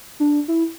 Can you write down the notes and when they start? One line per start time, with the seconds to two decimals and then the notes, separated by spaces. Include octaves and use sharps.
0.20 D4
0.48 E4